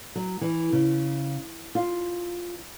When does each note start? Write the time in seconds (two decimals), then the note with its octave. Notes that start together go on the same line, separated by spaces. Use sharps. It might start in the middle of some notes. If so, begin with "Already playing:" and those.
0.16 F#3
0.41 E3
0.73 C#3
1.75 F4